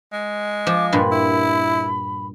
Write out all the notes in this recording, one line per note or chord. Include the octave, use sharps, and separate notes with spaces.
G#3
F3 D6
G2 A#2 B5
E4